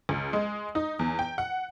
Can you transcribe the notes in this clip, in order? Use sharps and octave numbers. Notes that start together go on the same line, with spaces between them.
C#2
G#3
D#4
E2
G5
F#5